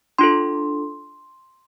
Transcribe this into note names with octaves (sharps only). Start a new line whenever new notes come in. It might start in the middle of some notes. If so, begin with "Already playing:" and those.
D4 F4 A4 C6